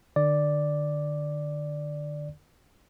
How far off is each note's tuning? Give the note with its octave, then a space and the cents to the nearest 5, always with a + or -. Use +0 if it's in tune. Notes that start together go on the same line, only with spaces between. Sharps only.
D3 +30 D5 +0